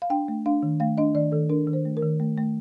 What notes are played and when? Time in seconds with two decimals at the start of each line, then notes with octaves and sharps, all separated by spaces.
0.02 F5
0.10 D4 G5
0.28 A3
0.46 D4 F5
0.63 D#3
0.80 A3 F5
0.98 D4 D#5
1.15 D#3 D5
1.32 D#3 A4
1.49 D4 A#4
1.67 D#3
1.73 C5
1.85 A3
1.97 A#4
2.03 D#3
2.20 A3
2.38 A3